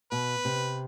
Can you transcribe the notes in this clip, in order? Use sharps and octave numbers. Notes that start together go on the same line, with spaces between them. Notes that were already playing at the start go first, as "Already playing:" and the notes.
B2 B4
C3